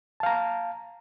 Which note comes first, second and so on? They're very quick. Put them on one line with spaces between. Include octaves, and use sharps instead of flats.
A5 F5 A#5